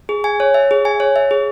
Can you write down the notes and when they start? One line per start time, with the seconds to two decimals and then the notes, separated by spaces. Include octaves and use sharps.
0.09 G#4
0.24 G#5
0.40 C#5
0.54 E5
0.71 G#4
0.85 G#5
1.00 C#5
1.16 E5
1.31 G#4